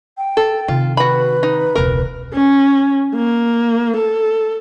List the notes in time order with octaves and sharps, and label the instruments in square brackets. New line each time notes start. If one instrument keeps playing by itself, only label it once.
[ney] G5
[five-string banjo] A4
[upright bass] C3 D#3 [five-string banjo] F4
[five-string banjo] F#4 B5 [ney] B4
[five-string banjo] D#4
[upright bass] E1 C#2 [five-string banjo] A#4
[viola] C#4
A#3
A4